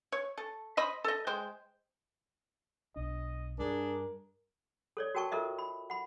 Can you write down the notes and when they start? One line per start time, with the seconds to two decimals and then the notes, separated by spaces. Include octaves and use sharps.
0.12 C#5
0.38 A4
0.77 C5 D#5 B5
1.04 A4 D#5
1.27 G#3 C5 G5
2.96 B1 D4 D#5
3.59 G2 D4 G#4 A#4
4.97 A4 C#5 D5
5.15 F#4 A#4 G5 A5 C#6
5.32 F4 A4 A#4 C5 D#5 E5
5.59 B5
5.90 F#5 B5